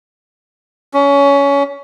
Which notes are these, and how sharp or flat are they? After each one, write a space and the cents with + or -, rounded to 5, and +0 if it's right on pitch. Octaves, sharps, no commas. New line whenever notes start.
C#4 +20